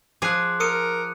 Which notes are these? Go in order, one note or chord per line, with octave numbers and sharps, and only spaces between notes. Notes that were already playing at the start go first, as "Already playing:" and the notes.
F3 G#4 D6 F#6
A#4 D#6 C#7 D#7